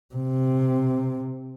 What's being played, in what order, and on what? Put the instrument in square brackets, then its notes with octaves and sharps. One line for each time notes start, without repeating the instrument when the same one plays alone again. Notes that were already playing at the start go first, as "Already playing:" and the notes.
[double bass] C3